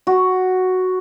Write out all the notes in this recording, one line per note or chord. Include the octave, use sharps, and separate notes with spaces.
F#4